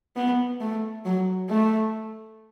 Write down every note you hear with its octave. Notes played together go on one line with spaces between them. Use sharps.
B3
A3
F#3
A3